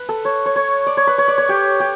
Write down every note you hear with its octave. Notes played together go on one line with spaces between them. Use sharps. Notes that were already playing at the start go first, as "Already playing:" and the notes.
Already playing: B4
A4
C#5
C#5
C#5
D5
C#5
B4
C#5
D5
C#5
G4
G4